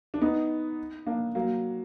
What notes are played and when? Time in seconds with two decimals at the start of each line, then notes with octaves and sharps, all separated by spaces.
0.14 D4
0.21 B3 D#4
1.06 A#3 D4
1.35 F#3 A#3